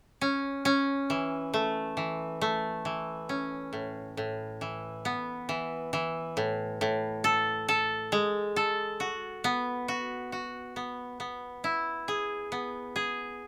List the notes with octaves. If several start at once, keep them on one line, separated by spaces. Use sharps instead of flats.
C#4
C#4
E3
A3
E3
A3
E3
C#4
A2
A2
E3
B3
E3
E3
A2
A2
A4
A4
G#3
A4
F#4
B3
F#4
F#4
B3
B3
E4
G#4
B3
G#4